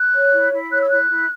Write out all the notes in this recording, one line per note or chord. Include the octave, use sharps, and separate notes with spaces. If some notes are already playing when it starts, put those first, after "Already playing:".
Already playing: F#6
C#5
E4
E4
C#5 F#6
E6
E4 F#6
E4